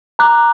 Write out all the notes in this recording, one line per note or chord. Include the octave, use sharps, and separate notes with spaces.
A#5 D6 F#6